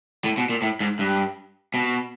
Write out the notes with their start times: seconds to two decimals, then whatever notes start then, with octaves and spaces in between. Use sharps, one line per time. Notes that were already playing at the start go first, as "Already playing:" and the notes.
0.24 A2
0.38 B2
0.49 A#2
0.62 A2
0.80 G#2
0.99 G2
1.74 B2